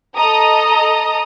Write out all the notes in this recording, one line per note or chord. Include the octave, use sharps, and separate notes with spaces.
A4 D#5 A#5 D#6